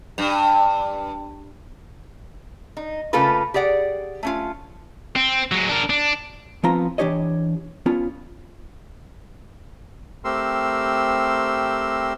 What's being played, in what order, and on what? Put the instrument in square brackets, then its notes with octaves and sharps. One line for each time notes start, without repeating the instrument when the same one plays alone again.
[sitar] G2
[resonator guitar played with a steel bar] D#4
C#3 A3 A#3 F4 A4 B4
G4 G#4 D5 F#5
A3 C#4 F4
[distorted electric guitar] C4
F#3 G#3
D4 A#4
D4
[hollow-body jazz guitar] F3 B3 C4 F4 A#5
E3 D4 G4 C#5 D#5
B3 C#4 F4
[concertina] A3 C4 G4 A#4 C6 E6